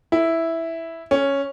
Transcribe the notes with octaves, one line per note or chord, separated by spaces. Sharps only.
E4
C#4